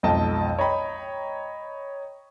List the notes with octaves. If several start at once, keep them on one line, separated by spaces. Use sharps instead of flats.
B1 F2 G#2 D#5 G5 A5
C#5 D#5 G5 A#5 B5